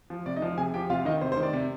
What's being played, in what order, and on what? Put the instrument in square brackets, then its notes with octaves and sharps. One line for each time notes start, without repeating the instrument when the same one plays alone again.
[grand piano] F3
C3 D5
D#4 D#5
F3
C3 G#4 G#5
F3 G4 G5
C3 F4 F5
D#3 D#4 D#5
C3 C5
C5
D#3
D5
C3